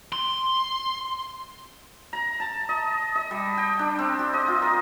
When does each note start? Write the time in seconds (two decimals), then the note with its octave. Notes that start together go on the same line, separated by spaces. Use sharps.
0.13 C6
2.13 A#5
2.40 A5
2.69 D#5
3.15 D#5
3.31 G3
3.57 G5
3.79 D4
3.99 C4
4.19 G4
4.33 D#5
4.48 F4
4.62 A#4